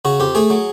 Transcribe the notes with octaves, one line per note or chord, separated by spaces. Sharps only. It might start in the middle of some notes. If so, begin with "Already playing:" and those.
C#3 F#4
F2 G4
A3 G#4
F#3